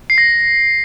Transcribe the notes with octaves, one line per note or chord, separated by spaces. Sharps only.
C7
A#6